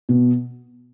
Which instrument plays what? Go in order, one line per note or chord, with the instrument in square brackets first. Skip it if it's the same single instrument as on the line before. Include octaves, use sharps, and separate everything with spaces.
[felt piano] B2